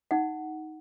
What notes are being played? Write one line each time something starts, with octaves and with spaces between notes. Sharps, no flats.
D#4 F#5